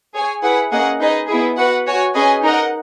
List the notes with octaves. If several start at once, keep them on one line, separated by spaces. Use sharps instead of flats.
G#4 C#5 G#5
E4 G#4 B4 F#5
A#3 C#4 G#4 D#5 F#5
D#4 G#4 B4 D#5
B3 E4 G#4
F#4 B4 F#5
F#4 C#5 G#5
C#4 G#4 B4 D#5 G#5
D#4 A#4 D#5 F#5